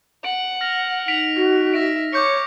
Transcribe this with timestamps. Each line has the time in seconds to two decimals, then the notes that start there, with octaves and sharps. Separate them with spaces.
0.24 F#5 D7
0.61 F6 A#6 F7
1.08 D#4 B6 D7 F7
1.36 F#4
1.74 E5 A#6 D7
2.13 C#5 C#6 D6 G6 C#7